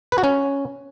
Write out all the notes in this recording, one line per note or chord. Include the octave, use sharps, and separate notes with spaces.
B4
F#4
C#4